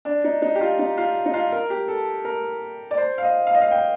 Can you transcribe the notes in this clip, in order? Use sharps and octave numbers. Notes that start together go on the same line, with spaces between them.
D4
D#4
D#4
G4
F4
D#4
F4
D#4
F4
A#4
G4
A4
A#4
D5
C5
F5
D#5
F5
D#5
F5
G5